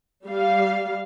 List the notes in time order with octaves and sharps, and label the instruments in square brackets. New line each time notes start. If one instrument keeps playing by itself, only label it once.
[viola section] G3 F5